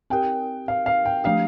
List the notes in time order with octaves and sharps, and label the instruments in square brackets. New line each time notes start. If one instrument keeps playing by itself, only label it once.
[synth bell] C4 G4 A#4 [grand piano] G5
[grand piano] F5
F5
G5
[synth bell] F3 A3 D4 G4 [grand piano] F5